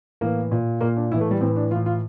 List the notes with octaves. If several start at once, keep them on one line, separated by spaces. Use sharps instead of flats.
A2 E3 A#3
A#2
A#2 A#3
D4
A2 E3 E4
A3
G3
A2 E3 C4
D4
A2 E3 F4
F4